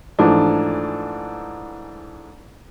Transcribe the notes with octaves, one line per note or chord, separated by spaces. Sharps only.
G#2 E3 F3 A3 D4